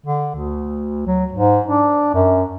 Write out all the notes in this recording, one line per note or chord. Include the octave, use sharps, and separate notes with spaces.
D3
D2
F#3
G#2
D4
F#2